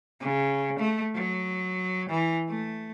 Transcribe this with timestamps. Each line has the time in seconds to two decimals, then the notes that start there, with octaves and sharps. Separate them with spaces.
0.21 C#3
0.79 A3
1.14 F#3
2.09 E3
2.48 A3